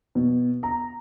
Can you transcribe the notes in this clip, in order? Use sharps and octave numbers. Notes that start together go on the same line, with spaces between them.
B2
A#5